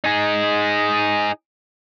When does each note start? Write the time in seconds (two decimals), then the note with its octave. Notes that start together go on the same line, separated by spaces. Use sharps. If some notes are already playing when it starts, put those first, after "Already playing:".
0.05 D#4 G#4